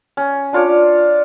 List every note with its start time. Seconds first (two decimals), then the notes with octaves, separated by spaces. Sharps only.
0.17 C#4
0.53 D4 F4 C#5 D5